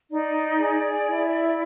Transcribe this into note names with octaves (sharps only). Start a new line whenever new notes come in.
D#4 D5
G#4
E4